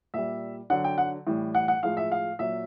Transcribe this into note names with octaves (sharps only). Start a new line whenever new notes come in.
A#2 G3 E5
D3 F#3 F#5
G5
F#5
A2 E3 G3
F#5
F#5
A2 F3 G#3 F5
E5
F5
A#2 F#3 E5